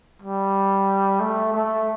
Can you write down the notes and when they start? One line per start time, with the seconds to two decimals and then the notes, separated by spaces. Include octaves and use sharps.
0.22 G3
1.20 A3
1.53 A3